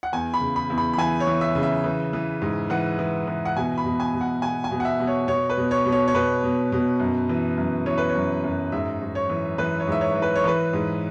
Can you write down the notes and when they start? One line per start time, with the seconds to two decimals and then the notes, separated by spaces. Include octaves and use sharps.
0.03 F#5
0.12 E2 G#5
0.34 B5
0.41 C#3
0.56 B5
0.70 E2
0.78 B5
0.93 B5
0.98 E3 G#5
1.20 C#5
1.27 E3
1.41 E5
1.55 C#3
1.63 E5
1.84 E3
2.13 E3
2.42 G#2
2.70 E3 F#5
2.99 E3
3.27 E3
3.45 F#5
3.57 B2 G#5
3.78 B5
3.85 B2
4.00 G#5
4.14 B2
4.21 F#5
4.42 B2 G#5
4.64 G#5
4.71 B2
4.80 F#5
4.85 E5
5.00 B2
5.07 C#5
5.28 B2 C#5
5.49 B4
5.57 B2
5.71 C#5
5.85 B2
5.92 C#5
6.08 C#5
6.14 B2 B4
6.44 B2
6.72 B2
7.00 F#2
7.29 E3
7.57 F#2
7.86 E3 C#5
7.98 B4
8.09 C#5
8.15 F#2
8.44 F#2
8.72 G#2 E5
9.01 G#2
9.15 C#5
9.29 E3
9.58 E3 B4
9.80 C#5
9.87 G#2 E5
10.01 C#5
10.16 E3
10.22 B4
10.36 C#5
10.44 E3 B4
10.73 G#2